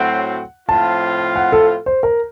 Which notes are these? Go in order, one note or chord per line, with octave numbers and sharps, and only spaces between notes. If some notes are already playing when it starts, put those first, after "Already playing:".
Already playing: A2 F#3 C4 F#5
A2 F3 C4 F4 A5
F#5
A4
C5
A#4